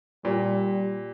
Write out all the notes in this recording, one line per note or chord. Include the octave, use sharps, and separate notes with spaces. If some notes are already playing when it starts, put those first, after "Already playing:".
A#2 G3